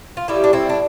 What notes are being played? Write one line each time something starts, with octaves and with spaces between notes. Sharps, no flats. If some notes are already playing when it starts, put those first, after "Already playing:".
F4
A2 G3 E4 G4
D4
C4 E4
D4